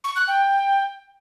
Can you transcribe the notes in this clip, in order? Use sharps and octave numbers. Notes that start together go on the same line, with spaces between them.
C#6
F#6
G5